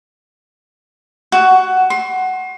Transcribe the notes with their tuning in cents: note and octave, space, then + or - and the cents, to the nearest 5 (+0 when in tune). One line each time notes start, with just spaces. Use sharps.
F#4 +10
C6 +35